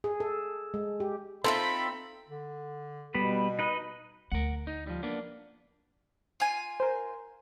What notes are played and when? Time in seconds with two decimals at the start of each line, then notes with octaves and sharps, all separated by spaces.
0.04 G#4
0.20 A4
0.74 G#3
1.00 G4
1.44 C4 D#4 F4 A4 E5 B5
2.28 D3
3.14 B2 G3 B3 B4
3.59 D#4 B4 D#5
4.32 D2 A3 A#4 F#5
4.67 D#4
4.87 F3 G3
5.03 A#3 B3 D4
6.40 F4 G#5
6.80 A#4 C5